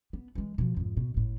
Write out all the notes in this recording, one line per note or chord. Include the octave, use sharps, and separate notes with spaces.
B3
E3 G#3
B2 F3
F2 G#2
B2
G1 A2